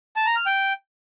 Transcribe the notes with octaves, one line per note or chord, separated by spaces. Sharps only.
A5
A#5
F6
G5